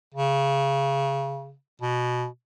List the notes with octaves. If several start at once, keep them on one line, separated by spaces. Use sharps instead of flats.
C#3
B2